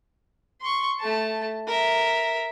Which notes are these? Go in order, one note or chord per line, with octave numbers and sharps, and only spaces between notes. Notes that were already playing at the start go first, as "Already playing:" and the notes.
C6 C#6
A3 A5
A#4 E5